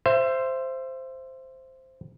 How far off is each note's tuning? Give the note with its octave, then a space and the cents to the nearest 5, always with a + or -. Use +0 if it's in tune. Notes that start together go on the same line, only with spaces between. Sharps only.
C5 +0 E5 +25